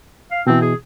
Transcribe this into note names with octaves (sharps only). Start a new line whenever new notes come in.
F5
B2 E3 C4
G#4